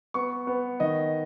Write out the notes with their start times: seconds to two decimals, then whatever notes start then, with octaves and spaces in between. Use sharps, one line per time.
0.14 B3 C#6
0.47 B3
0.80 D#3 D#5